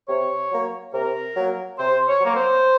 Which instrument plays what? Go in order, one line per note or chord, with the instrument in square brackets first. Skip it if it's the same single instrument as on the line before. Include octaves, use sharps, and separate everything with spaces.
[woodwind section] C3 C#5
F#3 A#3
C3 A#4
F#3 A#3
C3 C5
C#5
F#3 A#3
C5